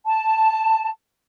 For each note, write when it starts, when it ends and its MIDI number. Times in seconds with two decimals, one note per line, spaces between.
0.05 0.88 81